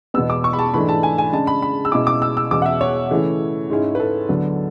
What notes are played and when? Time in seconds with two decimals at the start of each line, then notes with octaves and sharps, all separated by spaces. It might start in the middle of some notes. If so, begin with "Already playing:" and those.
0.14 E2 B2 G#3 B3 E6
0.30 D6
0.44 C#6
0.53 B5
0.59 A5
0.74 G#2 E3 A3 D4 B5
0.89 A5
1.03 G#5
1.18 G#5
1.33 C#3 G#3 D4 A5
1.47 B5
1.62 B5
1.85 E6
1.92 B2 G#3 C#4 E4 D6
2.07 D6
2.22 E6
2.37 E6
2.51 E2 B2 G#3 C#4 D6
2.62 F#5
2.66 E5
2.81 C#5
3.10 C#3 E3 A3 E4
3.70 G#2 G#3 C#4 E4
3.95 B4
4.00 A4
4.29 D2 D3 F#3 B3 D4